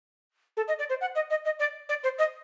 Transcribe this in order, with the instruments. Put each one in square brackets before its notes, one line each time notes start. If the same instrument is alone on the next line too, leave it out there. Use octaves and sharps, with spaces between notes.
[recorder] A4
D#5
D5
C5
F#5
D#5
D#5
D#5
D5
D5
C5
D#5